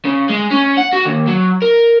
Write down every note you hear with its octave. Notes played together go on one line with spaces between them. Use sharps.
C#3
G#3
C#4
F#5
F#4
D#2
F#3
A#4